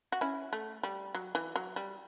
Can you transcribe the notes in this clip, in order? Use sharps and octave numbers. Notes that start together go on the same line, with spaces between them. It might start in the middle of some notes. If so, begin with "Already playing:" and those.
F#4
C#4 E4
A3
G3
F#3
E3
F#3
G3